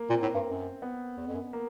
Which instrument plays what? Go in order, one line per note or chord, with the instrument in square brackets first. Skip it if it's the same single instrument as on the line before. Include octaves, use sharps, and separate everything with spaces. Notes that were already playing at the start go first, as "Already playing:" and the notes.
Already playing: [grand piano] A#3
[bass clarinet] A#2 [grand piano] C4
[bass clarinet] A2
G2
F#2
[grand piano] B3
[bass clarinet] E2
F2
F#2
[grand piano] A#3